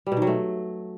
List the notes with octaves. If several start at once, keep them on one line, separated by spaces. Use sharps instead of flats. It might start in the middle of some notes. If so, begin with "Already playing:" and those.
G3
B2
D#3
F#3
A3